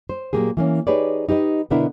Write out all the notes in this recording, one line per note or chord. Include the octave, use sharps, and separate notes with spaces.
C5
A#2 D3 F#3 A#3 G4 G#4
E3 A#3 C#4
D#4 G4 G#4 B4 C#5 D5
D#4 G4 B4 D#5
B2 D3 B3 D4 E4 A#4